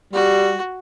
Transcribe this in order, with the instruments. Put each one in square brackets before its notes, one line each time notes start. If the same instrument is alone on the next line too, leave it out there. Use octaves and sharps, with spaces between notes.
[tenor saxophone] G3 [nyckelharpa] F#4